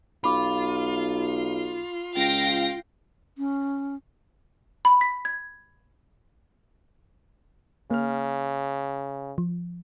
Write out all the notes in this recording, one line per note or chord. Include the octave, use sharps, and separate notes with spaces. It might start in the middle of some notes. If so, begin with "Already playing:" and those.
B1 F4 B5 D6
C#2 F5 G5 A#6
C#4
B5
B6
G#6
C#3 A#3 F6
F3